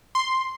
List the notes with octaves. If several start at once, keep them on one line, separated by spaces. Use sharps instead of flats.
C6